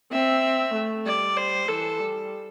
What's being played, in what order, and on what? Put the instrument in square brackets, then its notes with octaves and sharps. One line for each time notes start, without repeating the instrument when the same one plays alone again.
[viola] C4 [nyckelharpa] E5
[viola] A3
[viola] G3 [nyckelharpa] D5
[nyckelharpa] C5
[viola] E3 [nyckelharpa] A4
[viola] G3